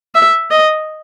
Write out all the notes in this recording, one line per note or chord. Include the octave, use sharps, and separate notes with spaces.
E5
D#5